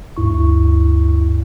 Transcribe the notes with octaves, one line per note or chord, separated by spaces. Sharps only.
D2 G2 E4 C#6